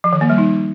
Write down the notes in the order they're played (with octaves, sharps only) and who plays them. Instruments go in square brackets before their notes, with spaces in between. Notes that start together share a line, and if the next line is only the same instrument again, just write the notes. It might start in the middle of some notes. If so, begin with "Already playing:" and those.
[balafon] F3
D#3
A#3
G3
D#4